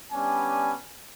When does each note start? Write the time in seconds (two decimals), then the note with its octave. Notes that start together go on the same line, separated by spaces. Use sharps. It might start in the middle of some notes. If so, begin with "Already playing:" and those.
0.12 G3 B3 C#4 D4 G#5